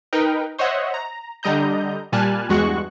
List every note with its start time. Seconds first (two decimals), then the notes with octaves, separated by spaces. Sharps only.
0.13 D#4 A#4 B4 G5
0.58 C5 C#5 D#5 E5 F#5
0.94 A#5
1.43 D3 G3 D#5 A#5 G6
2.12 A#2 G3 G#5 A5 F6 F#6
2.49 E2 G2 G#3 F#4 C#6 F#6